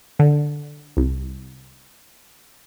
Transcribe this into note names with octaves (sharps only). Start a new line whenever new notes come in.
D3
C2